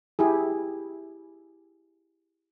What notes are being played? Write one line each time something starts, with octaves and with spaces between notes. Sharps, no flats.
E4 G4 G#4